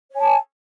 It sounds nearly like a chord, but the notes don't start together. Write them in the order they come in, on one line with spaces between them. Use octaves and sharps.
C#5 G#5 A5